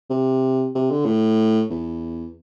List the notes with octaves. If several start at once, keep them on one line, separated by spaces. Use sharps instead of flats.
C3
C3
D3
A2
E2